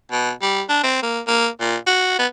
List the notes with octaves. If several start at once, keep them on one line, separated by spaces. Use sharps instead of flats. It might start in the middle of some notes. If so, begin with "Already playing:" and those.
B2
G3
D4
C4
A#3
A#3
A#2
F#4
B3